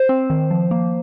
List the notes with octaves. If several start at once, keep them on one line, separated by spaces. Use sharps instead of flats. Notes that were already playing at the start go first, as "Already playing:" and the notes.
Already playing: C5
C4
D#3
F3
A#3